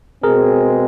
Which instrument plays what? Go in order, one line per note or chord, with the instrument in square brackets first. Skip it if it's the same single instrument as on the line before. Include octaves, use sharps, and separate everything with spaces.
[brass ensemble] B2 G#3 C4 [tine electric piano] G#4 A#4